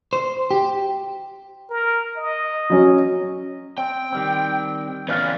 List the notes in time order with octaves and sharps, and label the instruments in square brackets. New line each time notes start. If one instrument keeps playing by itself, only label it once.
[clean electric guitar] C5
G4
[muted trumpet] A#4
D#5
[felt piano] F#3 C#4
[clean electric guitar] C4 [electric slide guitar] G5
[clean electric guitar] D#3 G3 C4
[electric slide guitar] E3 B3 C#4 [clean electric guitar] B4 D5 F5